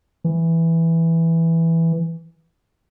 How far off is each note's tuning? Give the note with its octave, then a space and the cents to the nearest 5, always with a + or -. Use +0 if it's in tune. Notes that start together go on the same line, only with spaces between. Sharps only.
E3 +0